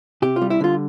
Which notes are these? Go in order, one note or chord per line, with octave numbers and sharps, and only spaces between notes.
C3 G4
F4
G3
E4
D3 F4